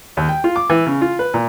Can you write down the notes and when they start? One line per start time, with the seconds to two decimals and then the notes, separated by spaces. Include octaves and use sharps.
0.17 D#2
0.29 G5
0.44 F4
0.56 D6
0.70 E3
0.87 C#3
1.02 F4
1.19 B4
1.34 A#2